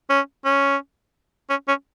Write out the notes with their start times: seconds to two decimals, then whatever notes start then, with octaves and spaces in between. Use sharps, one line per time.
0.10 C#4
0.45 C#4
1.50 C#4
1.68 C#4